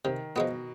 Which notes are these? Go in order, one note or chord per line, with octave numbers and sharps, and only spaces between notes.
C3 D#3
B2 F3 G#3 B3